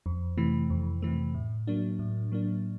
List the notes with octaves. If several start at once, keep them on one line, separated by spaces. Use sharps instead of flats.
F2
C3 E3 A3
F2
C3 E3 A3
A2
F#3 A#3 D4
A2
F#3 A#3 D4